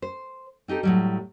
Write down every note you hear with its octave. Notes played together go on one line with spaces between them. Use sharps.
C5
C4 D#4 G4 A4
A2 F#3 G3